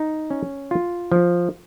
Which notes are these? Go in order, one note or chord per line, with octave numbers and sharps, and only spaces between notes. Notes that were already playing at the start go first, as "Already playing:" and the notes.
Already playing: D#4
C#4
F4
F3